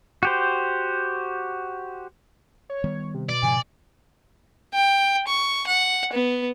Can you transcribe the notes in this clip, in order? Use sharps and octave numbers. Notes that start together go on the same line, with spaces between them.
F#4 G4 C5
C#5
D#3 G3 B3
C3
B2 D5
G#2 C#3 F3 G#5
G5
C#6
F#5
B3